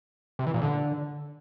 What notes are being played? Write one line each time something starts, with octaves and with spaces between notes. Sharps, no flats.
C3
E3
A#2
D3